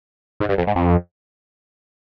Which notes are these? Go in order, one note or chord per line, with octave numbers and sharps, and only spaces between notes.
G#2
G2
F2
G#2
F2